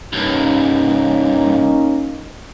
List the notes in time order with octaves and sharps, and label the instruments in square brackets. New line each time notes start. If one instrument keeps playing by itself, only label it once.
[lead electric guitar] C2 G2 [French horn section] A#3 C#4 D#4